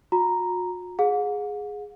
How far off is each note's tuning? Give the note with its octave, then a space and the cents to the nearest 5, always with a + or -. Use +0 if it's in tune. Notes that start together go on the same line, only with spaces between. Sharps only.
F#4 -45 A#5 +0
G#4 +0 F#5 -45